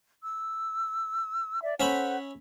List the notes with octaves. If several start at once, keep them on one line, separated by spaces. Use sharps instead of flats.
E6
D5 E5
C#4 A4 C5 E5 F#5 B5